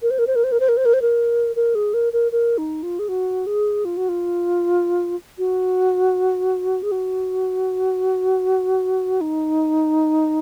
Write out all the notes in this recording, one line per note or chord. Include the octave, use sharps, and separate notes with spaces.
A#4
C5
A#4
C5
A#4
C5
A#4
C5
A#4
C5
A#4
C5
A#4
A#4
G#4
A#4
A#4
A#4
D#4
F4
G#4
F#4
G#4
F4
F#4
F4
F#4
G#4
F#4
D#4